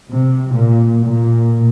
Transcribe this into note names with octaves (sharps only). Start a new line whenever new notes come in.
C3
A#2
A#2